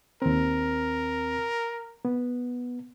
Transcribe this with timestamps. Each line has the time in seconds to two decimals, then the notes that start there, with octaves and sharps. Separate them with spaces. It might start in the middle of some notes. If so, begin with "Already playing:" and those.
0.22 D#2 C4 A#4
2.05 B3